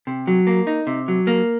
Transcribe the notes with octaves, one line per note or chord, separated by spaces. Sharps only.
C3
F#3
A#3
D#4
C3
F#3
A#3